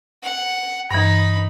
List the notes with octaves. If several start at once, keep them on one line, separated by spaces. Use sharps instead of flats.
F#5
G2 E3 D#4 B5